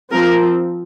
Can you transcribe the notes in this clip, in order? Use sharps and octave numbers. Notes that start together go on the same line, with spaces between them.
F3 C4 A#4